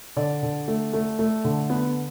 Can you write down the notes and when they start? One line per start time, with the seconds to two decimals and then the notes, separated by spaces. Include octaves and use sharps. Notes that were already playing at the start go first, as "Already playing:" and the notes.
0.16 D3 D5
0.43 D3
0.68 A3
0.93 A3
1.19 A3
1.44 D3
1.70 B3